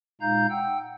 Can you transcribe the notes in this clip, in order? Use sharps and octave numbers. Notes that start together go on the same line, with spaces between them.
A#2 G#3 D#4 F5 A#5 G6
F#5 G5 E6